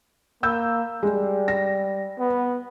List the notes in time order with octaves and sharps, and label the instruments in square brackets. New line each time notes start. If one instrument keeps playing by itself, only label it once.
[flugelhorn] A#3 [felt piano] B5 E6 G6
[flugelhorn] G3 [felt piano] G#3
[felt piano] A#6
[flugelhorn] B3